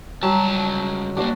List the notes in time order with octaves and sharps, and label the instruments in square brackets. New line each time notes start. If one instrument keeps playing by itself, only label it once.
[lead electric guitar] C#2 A5 [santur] F#3 [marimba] G3
[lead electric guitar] C#3 A#3 [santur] D4 F#4 D5